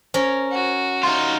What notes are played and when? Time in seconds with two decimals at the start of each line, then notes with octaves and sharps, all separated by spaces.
0.14 C#4 A#4 C5
0.52 F#4
1.03 D#4 F4 C6